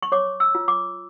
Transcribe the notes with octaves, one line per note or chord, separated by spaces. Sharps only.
C#6
C#5 D6
E6
F4
D6